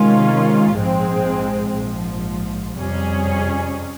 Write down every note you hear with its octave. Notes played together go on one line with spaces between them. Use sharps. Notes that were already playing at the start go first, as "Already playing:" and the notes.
Already playing: C3 D#3 G#3 C#4 F4
A#1 G#2 F3 G#3 C4
A#1 G#2 F3
F2 C3 G3 C#4 G#4